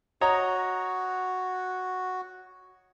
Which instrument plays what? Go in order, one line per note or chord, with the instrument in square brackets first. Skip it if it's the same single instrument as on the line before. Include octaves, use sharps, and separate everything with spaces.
[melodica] F#4 [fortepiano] C#5 D#5 A#5